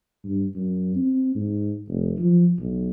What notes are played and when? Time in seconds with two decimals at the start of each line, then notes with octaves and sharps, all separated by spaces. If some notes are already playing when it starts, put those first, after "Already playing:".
0.24 G2
0.55 F#2
0.96 C4
1.35 G#2
1.88 F1
2.18 F3
2.59 B1